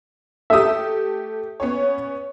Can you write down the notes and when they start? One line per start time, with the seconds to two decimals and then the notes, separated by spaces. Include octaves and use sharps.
0.50 A3 G4 E5 D#6
1.60 B3 C#4 C#5